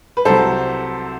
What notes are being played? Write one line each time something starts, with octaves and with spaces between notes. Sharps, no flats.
B4
C2 C3 F#3 A4 C5